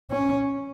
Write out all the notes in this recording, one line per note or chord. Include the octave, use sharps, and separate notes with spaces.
C#4